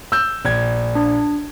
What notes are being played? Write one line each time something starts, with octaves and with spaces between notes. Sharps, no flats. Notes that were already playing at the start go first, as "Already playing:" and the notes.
E6 G6
A#1 G#6
D4